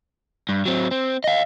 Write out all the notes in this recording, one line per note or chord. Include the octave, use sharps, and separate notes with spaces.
G2
F#3 C4
C4
D#5 F5